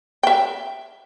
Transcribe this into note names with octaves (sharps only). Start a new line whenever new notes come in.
E5 G5